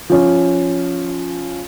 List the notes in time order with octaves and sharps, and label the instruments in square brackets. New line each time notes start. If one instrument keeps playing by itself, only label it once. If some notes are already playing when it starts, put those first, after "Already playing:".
[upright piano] F3 C#4